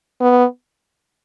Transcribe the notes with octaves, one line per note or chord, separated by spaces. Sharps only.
B3